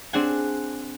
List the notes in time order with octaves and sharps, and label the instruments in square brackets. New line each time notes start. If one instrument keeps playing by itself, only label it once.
[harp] C4 D4 G#4 F#5 G#5